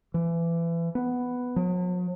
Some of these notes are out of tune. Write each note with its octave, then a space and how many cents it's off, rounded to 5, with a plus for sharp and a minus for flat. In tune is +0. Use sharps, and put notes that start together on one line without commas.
E3 +30
B3 +5
F#3 -45